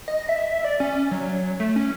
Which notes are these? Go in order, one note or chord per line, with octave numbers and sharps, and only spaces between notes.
D#5
E5
D5
C#4
F#3
A3
C#4